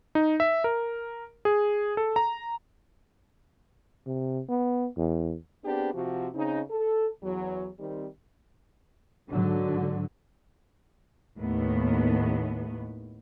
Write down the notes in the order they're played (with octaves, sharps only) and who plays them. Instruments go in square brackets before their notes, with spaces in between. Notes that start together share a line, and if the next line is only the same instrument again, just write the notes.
[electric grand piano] D#4
E5
A#4
G#4
A4
A#5
[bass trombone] C3
B3
E2
[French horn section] B3 C4 D4 G4 G#4
C3 F3 F#4
C#3 C4 D#4
A4
E2 F#3
D#3 G3 C4
[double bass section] G#2 D3 F#3
[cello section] D#2 A2 B3